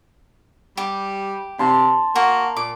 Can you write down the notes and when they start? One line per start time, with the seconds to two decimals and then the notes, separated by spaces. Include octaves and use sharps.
0.77 G3 G4
1.59 C3 A5 C6
2.16 A#3 F#4
2.57 A#2 D6